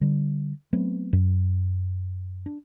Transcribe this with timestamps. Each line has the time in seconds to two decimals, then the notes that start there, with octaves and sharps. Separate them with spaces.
0.01 D3 G3
0.73 F#3 A3 B3 C4
1.13 F#2
2.46 D4